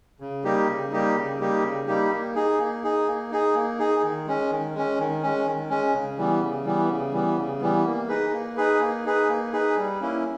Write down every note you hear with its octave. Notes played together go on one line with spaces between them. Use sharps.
C#3
G3 A#3 D#4 G4
C#3
G3 A#3 D#4 G4
C#3
G3 A#3 D#4 G4
C#3
G3 A#3 D#4 G4
A#3
D#4 G#4
A#3
D#4 G#4
A#3
D#4 G#4
A#3
D#4 G#4
D#3
G#3 C#4
D#3
G#3 C#4
D#3
G#3 C#4
D#3
G#3 C#4
C#3
E3 G3 B3
C#3
E3 G3 B3
C#3
E3 G3 B3
C#3
E3 G3 B3
A#3
D#4 G#4 B4
A#3
D#4 G#4 B4
A#3
D#4 G#4 B4
A#3
D#4 G#4 B4
G3
A#3 C#4 E4